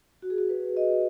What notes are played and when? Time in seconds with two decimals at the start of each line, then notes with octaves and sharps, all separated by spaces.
0.22 F#4
0.30 G#4
0.38 F#4
0.50 B4
0.77 D#5